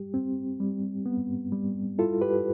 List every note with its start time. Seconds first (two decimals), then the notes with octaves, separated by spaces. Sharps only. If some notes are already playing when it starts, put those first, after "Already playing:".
Already playing: G3 G4
0.14 C4
0.60 G3
1.06 B3
1.52 G3
1.99 E4 F4 A4
2.22 G4 B4